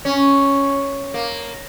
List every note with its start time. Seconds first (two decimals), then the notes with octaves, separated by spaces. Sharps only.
0.05 C#4
1.14 A#3